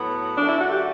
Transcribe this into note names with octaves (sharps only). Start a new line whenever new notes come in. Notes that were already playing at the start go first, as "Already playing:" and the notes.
Already playing: A2 F#3 B3
F#2 D3 A3 D4
E4
F#4
G4